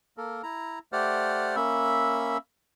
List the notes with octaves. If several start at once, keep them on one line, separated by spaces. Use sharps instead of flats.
A#3 A4 A#4
E4 A#5
A3 G4 C5 D5 F#5 F6
A#3 C#4 E5 B5 E6